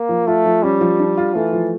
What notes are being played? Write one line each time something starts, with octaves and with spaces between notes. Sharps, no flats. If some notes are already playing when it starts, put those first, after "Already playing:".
Already playing: A#3
F3
A3 F4
F3
G3 C#4
F3
D4
F4
E3 A3
F3